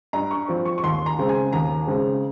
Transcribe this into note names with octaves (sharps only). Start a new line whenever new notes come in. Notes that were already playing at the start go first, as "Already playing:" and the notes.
G2 A#5
C#6
F3 C4
C#6
C#6
D#2 C6
A#5
C#3 G#3 C4
G#5
D#2 A#5
C#3 G#3 C4